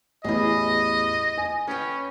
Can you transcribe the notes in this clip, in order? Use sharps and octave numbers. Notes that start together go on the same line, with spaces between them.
A1 E2 E4 G#4 D#5
G#5
C#4 B4 C#5 G5